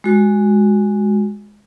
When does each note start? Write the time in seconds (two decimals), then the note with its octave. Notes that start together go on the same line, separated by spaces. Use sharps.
0.04 G#3 F#4